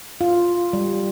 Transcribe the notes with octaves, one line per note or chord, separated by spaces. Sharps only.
F4
G3